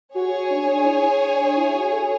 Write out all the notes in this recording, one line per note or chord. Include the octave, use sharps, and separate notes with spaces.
F#4 G#4 C#5 G#5
D4
D4
E4
D4
E4
F#4
A4